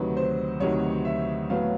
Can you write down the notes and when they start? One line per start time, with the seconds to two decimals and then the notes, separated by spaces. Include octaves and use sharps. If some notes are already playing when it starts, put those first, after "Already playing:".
Already playing: D2 C3 D#3 F#3 B4
0.17 C5
0.60 D2 C3 D#3 F#3 C#5
1.05 E5
1.49 A2 F#3 B3 F5